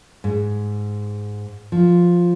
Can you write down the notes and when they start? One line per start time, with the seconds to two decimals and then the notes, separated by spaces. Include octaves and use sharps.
0.24 G#2
1.72 F3